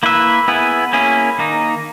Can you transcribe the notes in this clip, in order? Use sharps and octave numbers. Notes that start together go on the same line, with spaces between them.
A#3 E4 B4 E5
B3 E4 G#4
A#3 C#4 E4 G#4
D#3 A#3 D#4